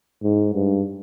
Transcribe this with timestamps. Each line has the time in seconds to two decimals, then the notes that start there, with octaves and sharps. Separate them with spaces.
0.23 G#2
0.54 G2